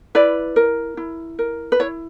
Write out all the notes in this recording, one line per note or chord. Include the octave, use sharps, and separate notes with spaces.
E4 B4 D5
A#4
E4
A#4
B4
E4 C#5